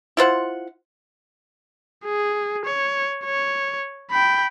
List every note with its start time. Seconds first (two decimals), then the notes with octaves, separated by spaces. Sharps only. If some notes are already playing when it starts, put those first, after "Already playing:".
0.17 E4 F4 C5 F#5
2.05 G#4
2.66 C#5
3.25 C#5
4.11 G5 B5